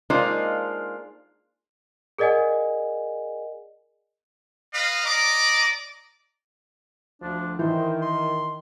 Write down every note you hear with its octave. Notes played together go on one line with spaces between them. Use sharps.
G#3 A#3 D4 D#4 F4 C5
G#4 A#4 D5 D#5 F#5 G#5
B4 D#5 F5
D5 D#5 A#5 D6
D2 F3 D4
D#3 E3 C5
C6